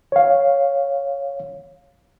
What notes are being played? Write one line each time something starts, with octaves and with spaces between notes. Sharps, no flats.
C#5 F5